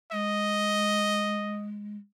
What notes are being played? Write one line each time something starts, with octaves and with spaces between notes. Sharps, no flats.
G#3 D#5